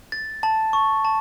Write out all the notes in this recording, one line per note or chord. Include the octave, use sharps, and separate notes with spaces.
A6
A5
C#6
A5